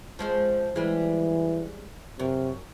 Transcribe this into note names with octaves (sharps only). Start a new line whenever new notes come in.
F3 G#3 C4
E3 G3 G#3
F#2 C3